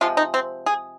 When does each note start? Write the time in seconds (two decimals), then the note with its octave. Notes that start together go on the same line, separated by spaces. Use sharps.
0.01 C3 F3 G#3 F4
0.17 D#4
0.34 C4
0.66 G#4